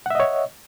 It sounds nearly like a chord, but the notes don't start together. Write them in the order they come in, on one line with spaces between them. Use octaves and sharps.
F#5 E5 D#5 C#5